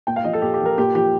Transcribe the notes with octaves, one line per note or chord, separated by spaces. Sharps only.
A#2 G5
F5
F3 D#5
A4
A#2 G4
G4
F3
A#4
A#2 G4
F3 G4